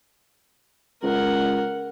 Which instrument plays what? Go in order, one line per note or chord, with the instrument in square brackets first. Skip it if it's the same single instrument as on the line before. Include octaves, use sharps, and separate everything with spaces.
[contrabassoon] C#2 [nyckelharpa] A#4 F#5